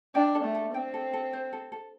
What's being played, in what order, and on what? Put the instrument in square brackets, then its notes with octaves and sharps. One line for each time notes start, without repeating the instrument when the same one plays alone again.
[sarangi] D4 [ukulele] G5
[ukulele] A4
[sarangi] A3
[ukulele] A4
[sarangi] C4 [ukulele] G5
[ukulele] A4
A4
C5
A4
A4